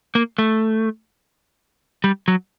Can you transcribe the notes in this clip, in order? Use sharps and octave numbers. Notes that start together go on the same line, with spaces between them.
A#3
A3
G3
F#3